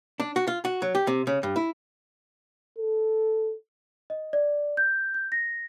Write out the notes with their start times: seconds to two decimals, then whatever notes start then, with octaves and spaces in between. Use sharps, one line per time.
0.20 D4
0.36 F#4
0.47 F4
0.65 F#4
0.82 F#3
0.95 G4
1.07 C3
1.27 C#3
1.43 G2
1.56 E4
2.78 A4
4.10 D#5
4.33 D5
4.77 G6
5.14 G6
5.32 A#6